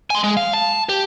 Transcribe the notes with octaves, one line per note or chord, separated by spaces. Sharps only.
G#5 C6
G#3
F5
A5
G4